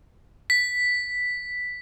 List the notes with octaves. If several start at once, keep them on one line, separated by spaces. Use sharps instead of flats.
B6